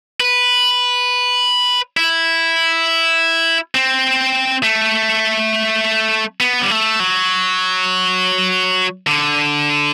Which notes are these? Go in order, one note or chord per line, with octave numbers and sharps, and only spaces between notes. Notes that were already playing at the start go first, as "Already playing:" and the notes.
B4
E4
C4
A3
B3
G3
A3
F#3
D3